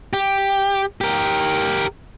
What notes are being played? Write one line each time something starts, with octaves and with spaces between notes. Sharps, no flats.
G4
G4 A#4